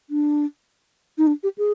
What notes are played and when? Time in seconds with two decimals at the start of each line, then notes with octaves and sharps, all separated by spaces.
0.10 D4
1.18 D#4
1.27 D4
1.43 G4
1.58 G#4